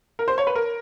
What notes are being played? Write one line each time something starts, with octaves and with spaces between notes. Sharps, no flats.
A#4
C5
C#5
B4
A#4